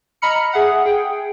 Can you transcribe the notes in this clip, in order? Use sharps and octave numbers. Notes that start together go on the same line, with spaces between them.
D#5 A#5 B5 F6 C#7
G#4 E5 F#5
G#4 G5